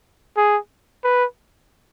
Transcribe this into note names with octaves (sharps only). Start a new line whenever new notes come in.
G#4
B4